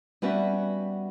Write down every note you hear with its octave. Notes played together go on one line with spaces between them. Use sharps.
G3 B3 C#4 F#4 B4 E5